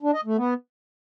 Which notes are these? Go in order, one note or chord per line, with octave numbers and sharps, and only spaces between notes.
D4
D#5
A3
B3